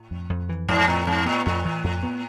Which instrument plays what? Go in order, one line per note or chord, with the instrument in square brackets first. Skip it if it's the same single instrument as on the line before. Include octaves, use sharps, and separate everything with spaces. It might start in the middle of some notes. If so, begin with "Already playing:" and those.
Already playing: [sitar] A2
[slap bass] F2
F2
E3
[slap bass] F2 [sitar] G#2
[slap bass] F2 [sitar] A2
[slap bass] F2 [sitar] G#2
[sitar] A2 [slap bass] B3
[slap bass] F2 [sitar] A2
[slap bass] E3
F2
B3